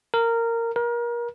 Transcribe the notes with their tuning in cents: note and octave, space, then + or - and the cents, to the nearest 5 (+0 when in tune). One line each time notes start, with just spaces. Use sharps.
A#4 -15
A#4 +30